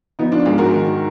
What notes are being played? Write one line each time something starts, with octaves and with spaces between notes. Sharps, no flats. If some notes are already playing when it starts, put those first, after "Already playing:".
F3 B3 D#4
D4 F4
G#2 F4 G#4
F#4 A#4
D#3